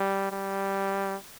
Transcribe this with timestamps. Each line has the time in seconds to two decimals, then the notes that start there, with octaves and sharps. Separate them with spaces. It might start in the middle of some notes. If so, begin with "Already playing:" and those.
Already playing: G3
0.32 G3